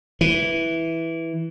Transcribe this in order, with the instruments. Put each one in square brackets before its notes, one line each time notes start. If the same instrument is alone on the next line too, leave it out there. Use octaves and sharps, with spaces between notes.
[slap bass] E3